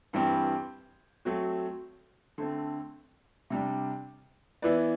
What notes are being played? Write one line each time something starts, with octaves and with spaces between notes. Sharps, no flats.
G2 E3 G3 C4 G4
F#3 A3 C4 F#4
D3 A3 C4
C3 G3 D4
E3 B3 E4 B4 D5